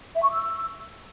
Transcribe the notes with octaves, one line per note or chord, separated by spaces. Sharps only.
E5
C#6
E6